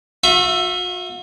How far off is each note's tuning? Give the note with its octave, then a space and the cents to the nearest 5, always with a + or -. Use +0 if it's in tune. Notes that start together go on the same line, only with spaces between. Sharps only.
F#4 -45 E5 +15